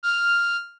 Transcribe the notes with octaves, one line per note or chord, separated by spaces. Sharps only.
F6